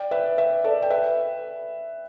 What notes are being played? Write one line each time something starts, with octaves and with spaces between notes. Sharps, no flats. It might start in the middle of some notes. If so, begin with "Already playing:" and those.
Already playing: D5 G5
B4 E5
B4 E5
A4 D5
G5
B4 E5